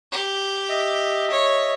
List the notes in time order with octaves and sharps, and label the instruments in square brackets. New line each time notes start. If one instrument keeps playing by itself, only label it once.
[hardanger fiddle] G4
[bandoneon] D#5 E5
[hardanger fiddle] C#5